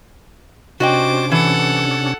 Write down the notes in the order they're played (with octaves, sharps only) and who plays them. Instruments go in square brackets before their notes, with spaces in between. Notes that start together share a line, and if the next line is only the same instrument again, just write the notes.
[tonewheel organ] C3 C#4 D4 [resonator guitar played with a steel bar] F#4 D#5 G5 [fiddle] C5 D6
[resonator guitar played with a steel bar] E3 [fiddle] A4 F#5